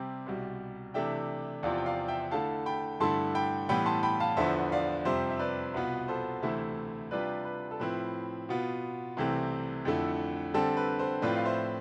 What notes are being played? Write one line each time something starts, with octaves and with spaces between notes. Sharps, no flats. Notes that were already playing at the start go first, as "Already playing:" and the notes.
Already playing: C3 G3 C4
C2 B2 G3
C3 E3 A3 D4 E5 G5
E2 C3 F3 C4 F4 D5 F5
G5
D5 F5
E5 G5
D3 A3 E4 F5 A5
G5 B5
G2 D3 A3 E4 A5 C6
G5 B5
A2 E3 G3 B3 G5 B5
A5 C6
G5 B5
F5 A5
E2 D3 F3 B3 C5 E5
D5 F5
F2 C3 G3 C5 E5
E5
B4 D5
C2 B2 B3 F4 B4
A4 C5
D2 C3 E3 A3 E4 C5 E5
C3 G3 D4 F4 B4 D5
B4
A4
A2 F3 C4 E4 B4
B2 B3 F4
C2 C3 E3 A3 C4
F2 D3 A3 E4
D3 G3 C4 A4
B4
A4 C5
A2 F3 C4 F4 B4 D5
F5
C5 E5